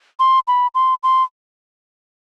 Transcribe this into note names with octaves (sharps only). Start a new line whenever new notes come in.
C6
B5
C6
C6